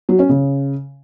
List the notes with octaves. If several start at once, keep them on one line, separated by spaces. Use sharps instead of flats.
F#3
C#4
C#3